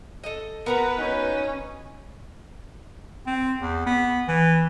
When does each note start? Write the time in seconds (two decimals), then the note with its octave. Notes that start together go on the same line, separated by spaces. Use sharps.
0.24 A4 D#5
0.66 B3 F#4 A#4 B4 A#5
0.98 C#4 D#4
3.27 C4
3.60 E2
3.87 B3
4.28 E3